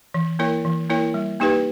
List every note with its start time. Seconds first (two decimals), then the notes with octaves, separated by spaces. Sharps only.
0.14 E3
0.39 A#3 E4 A#4 C#5
0.65 E3
0.90 A#3 E4 A#4 C#5
1.14 G3
1.40 A#3 D#4 G4 B4